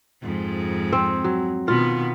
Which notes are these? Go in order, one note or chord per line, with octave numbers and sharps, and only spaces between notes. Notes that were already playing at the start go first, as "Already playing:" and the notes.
F2 G#2 G#3
C4
F#3
B2 D#3 B3 F4